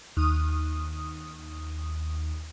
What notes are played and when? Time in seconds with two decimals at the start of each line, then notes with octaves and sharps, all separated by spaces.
0.17 D#2 D#6